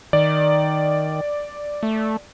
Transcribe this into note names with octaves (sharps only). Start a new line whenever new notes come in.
D#3 D5
A3